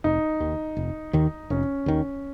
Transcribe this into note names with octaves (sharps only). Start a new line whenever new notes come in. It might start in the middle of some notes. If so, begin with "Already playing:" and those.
F1 D#4
D#2 D#3
F1
D#2 D#3
F1 C#4
D#2 D#3